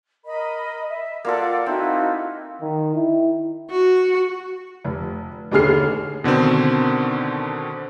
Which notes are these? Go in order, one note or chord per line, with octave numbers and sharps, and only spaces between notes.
A#4 D#5 B5
E5
A#3 F4 A4 D5 F#5
C4 D#4 E4 F#4
D#3
E4
F#4
F1
A1 D#2 D3 G#4 F6 C7
B2 D3 D#3 C4